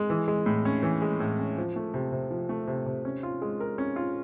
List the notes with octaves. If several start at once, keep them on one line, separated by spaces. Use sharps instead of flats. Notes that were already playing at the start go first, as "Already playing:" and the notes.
Already playing: G#3
E3
G#3
A2
C#4
E3
G#3
A2
C#4
F3
A3
C3
C3
F3
A3
C3
C3
C#4
F4
G#3
A#4
C#4
F4